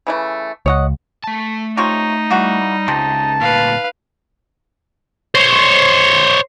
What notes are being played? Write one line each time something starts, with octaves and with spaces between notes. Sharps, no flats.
C#3 E3 A3
C#2 C#5 D#5 F#5
A3 A5
C3 D#4 F4 C#5
E3 G3 A#3 F#4
C#2 C3 A5
D2 A#2 B4 F5
C5 C#5